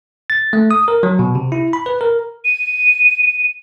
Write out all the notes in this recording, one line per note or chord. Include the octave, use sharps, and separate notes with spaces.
A6
A3
D#6
A#4
F#3
B2
C3
E4
B5
B4
A#4
D#7